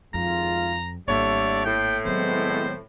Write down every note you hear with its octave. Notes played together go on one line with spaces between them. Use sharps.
G#1 F2 G#3 F4 A#5
G#1 D3 G3 A3 A#3 E4 C#5 D5
A2 G5
D#3 F#3 G#3 B3 C4 C5